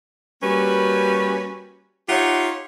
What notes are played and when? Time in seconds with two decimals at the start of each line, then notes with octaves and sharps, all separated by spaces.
0.43 G3 A#3 C#4 F#4 B4
2.09 D#4 F4 G4 C#5 E5 F#5